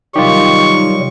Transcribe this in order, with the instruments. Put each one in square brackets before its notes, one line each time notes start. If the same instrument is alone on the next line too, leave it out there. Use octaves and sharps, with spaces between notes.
[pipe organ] C3 F#3 G3 [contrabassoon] D#3 [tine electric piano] F4 G4 [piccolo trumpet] C#6